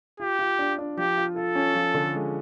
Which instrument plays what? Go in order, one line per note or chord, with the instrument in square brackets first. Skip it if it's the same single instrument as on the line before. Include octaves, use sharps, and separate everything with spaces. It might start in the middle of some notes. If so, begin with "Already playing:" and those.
[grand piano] F4 [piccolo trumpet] G4
[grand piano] F4
D4
D4
[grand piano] F3 [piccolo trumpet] G4
[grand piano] F4
[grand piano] F4 [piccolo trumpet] A4
[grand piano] C#4
F3
D3
G#3